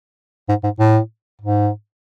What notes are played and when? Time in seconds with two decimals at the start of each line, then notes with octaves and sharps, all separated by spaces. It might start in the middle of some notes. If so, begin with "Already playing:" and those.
0.49 G#2
0.64 G#2
0.79 A2
1.41 G#2